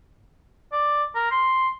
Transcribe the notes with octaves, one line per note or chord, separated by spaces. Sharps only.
D5
A#4
C6